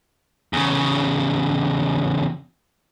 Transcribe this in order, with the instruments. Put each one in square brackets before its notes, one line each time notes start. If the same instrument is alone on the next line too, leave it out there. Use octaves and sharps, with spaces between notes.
[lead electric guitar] E2 C#3